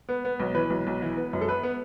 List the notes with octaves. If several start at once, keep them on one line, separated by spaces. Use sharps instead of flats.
B3
B3
B1
E3 B4
B1
B1
E3
B3
F#2
A4
B3 B4
B3